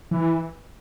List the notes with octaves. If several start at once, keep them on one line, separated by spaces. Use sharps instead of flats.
E3